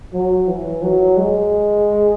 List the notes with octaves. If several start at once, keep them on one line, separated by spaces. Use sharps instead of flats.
F#3
E3
F#3
G#3